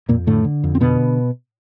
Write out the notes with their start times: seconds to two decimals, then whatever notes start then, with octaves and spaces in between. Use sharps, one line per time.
0.09 F2 A#2 A#3
0.27 A2 D3 A3
0.44 D3
0.64 F2
0.75 C4
0.81 B2 D3 B3